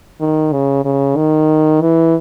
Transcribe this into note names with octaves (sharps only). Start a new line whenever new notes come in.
D#3
C#3
C#3
D#3
E3